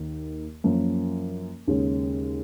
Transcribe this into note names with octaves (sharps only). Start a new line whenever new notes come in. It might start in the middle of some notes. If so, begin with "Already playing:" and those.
Already playing: D#2 D#3 A#3
F#2 F3 A#3 C#4
D#2 C#3 G#3 C#4